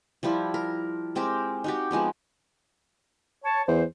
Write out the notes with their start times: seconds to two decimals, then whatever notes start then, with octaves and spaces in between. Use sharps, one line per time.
0.23 F3 G3 E4 F4
0.54 A#4
1.15 G#3 C4 G4 A#4
1.64 D#4 F#4 G4
1.91 F3 G#3 B3 C4
3.44 C#5 A5
3.68 E2 C5